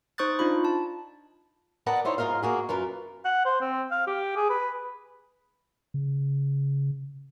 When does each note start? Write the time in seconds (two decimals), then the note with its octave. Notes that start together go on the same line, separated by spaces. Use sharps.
0.18 D#4 C5 C#6 D#6 F#6 A6
0.39 D4 D#4 F4 B5
0.65 A5
1.86 A#4 B4 D5 D#5 F#5 A5
2.05 D#4 E4 C5 C#5
2.18 G#2 F4 A#4 D#5 F5
2.42 A#3 F#4 G#4
2.69 F#2 F4 A#4 B4
3.25 F#5
3.45 C5
3.61 C4
3.91 F5
4.07 G4
4.36 G#4
4.50 B4
5.94 C#3